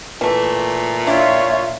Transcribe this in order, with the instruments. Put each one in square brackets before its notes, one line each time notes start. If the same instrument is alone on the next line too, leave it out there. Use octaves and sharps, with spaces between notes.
[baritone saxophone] A#2 [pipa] E3 A3
[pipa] D4 E4 [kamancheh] F4 C#5 [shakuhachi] E5